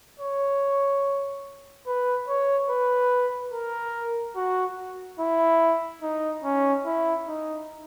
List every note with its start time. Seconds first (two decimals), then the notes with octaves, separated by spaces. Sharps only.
0.20 C#5
1.87 B4
2.28 C#5
2.69 B4
3.53 A#4
4.36 F#4
5.20 E4
6.03 D#4
6.44 C#4
6.85 E4
7.27 D#4